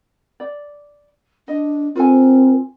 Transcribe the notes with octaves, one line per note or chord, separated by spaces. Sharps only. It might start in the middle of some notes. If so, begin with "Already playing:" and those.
D5
D4 D#5
C4 F4 A4 A#4 G#5